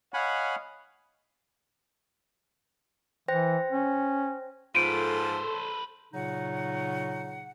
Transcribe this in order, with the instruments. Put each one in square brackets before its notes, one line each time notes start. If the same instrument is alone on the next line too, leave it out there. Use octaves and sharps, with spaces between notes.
[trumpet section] C#5 D#5 F5 [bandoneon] F#5 G#5 B5
[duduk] E3 [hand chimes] C5 G5 A#6
[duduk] C#4
[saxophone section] G#2 F3 F4 [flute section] A4 [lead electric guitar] B4 C5 [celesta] D7 D#7
[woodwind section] A#2 C#3 F#3 D#4 F#5